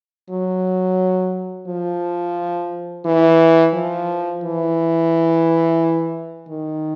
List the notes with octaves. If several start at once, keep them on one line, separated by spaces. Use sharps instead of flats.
F#3
F3
E3
F3
E3
D#3